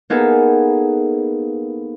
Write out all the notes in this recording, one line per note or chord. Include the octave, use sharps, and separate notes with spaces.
A#3 B3 D#4 G#4 A4